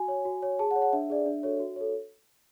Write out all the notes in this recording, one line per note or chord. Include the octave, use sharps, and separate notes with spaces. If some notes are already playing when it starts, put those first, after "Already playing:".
Already playing: F#4 G#5
C#5
F#4
C#5
G#4 A5
F#5
C#5
F#5
D4 E5
G#4 D5
D4
F#4 A4 C#5
F#4
A4 C#5